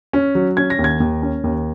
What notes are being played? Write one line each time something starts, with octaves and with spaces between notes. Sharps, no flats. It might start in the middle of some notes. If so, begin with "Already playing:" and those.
C#4
F#3
C#4 G#6
A#6
D#2
G#6
D#2
C#4
D#2